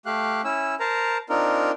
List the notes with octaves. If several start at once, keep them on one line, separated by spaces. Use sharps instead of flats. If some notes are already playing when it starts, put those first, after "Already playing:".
A3 G4 F5 F#6
C#4 E4 E6
A#4 C5 A5 A#5
C4 D4 D#4 F4 A#4